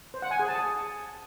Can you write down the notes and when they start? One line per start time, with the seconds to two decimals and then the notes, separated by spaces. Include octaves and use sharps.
0.14 C5
0.22 F#5
0.31 G#5
0.39 G#4
0.48 A5